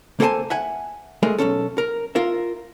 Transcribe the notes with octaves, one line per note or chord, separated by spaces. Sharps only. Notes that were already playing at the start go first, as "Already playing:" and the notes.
A#3 A4 C5 F#5 G#5 A5
E5 F#5 G#5
G#3 A3 G#4 A#4
B1 G2 C#4 A4
A#4
F4 A#4 E5